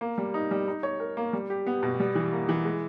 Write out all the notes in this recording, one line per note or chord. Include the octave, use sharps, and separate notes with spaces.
A#3
G3
D#4
G3
D#4
C#5
A#4
A#3
G3
G4
B3
B2
G3
E3
A#3
E3
G#3